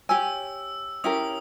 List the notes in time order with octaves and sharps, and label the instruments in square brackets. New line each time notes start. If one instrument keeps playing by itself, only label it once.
[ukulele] G4 C#5 G#5 [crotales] E6
[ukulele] C#4 E4 G4 A#4 [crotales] D#6